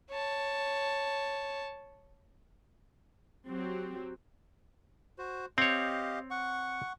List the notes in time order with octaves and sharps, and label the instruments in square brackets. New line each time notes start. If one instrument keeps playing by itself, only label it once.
[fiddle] C#5 A5
[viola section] F#3 C4 F#4 G4
[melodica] F#4 C5
[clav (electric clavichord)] C4 C#5 [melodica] G4 D#5 F5
[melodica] F#5 C#6